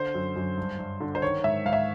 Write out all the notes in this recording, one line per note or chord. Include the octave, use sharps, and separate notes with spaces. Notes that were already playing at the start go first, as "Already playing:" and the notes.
Already playing: D3 C5
F#2
F#2
G2
G2
D3
C5
D#3 C#5
G#2 E5
G#2 F5
E5